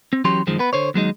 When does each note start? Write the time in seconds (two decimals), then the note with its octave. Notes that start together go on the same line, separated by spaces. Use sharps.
0.13 C4
0.25 E3 F#3 C#4 G4 C6
0.47 F#2 D#3 F3 G#3
0.59 B3 B4
0.73 D3 C5 C#5
0.94 D#2 F#3 G#3 D#4